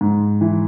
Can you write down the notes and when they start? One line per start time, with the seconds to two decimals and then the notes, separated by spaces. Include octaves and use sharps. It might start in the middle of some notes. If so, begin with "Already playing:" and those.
0.01 G#2
0.41 E3